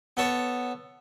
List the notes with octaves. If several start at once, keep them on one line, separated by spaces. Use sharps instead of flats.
B3 A4 C#5